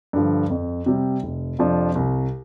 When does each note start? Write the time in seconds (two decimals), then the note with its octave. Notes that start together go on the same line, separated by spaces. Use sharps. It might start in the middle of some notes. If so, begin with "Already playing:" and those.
0.13 G2 D3 F3
0.50 F2
0.86 C3 G3
1.23 F1
1.59 F2 C3 F3 D4
1.96 C2